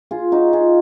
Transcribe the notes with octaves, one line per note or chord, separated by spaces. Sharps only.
F4 G#4
D#4 F#4
F4 G#4